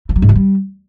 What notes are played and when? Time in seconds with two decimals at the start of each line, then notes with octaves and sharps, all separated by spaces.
0.09 E3
0.16 F#3
0.22 G#2
0.29 E3
0.35 G3